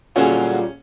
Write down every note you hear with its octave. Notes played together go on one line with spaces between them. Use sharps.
A#2 D3 F#3 G3 C#4 F4 F#4 G#4